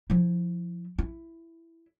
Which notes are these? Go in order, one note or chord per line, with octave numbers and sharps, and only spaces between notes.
F3 E4
E4